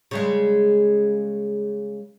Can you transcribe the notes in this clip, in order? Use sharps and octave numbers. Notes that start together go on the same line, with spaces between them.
C#3 G3 G#3